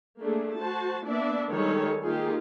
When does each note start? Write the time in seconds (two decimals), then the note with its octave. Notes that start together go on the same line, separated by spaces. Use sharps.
0.20 A3 A#3 D4 G#4
0.57 F#4 C5 A5
1.07 A#3 B3 D4 D5 E5
1.53 D#3 G3 G#3 A4 C#5
2.06 D#3 A#3 D#4 F4 G4 G#4